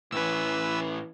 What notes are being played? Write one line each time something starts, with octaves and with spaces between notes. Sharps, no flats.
A2 E3 C#4 B4 E6